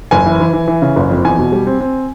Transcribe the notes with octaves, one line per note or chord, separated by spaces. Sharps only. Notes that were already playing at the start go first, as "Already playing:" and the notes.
F#1 G#5
E3
E3
E3
E3
C#3
F#1
F2
E2 G#5
B2
G3
C4
C4